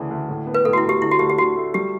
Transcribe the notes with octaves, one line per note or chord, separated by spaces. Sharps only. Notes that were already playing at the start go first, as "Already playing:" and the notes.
Already playing: D2 C#3 E3
D2
A2
B3
B4
A2 A4
F#4
E4
A2
G4
D3 E4
F#4
D2 G4
G4
D3 F#4
A3
G3 G4